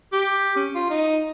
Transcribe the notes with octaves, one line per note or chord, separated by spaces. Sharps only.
G4
C#4
F4
D#4